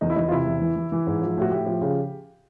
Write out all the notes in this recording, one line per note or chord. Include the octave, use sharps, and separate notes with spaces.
E2 D#4
E4
E2 D#4
F4
C3 E4
E2
E3
E3
E3
G#2
F3
A2 F#4
A2 G4
F3
C#3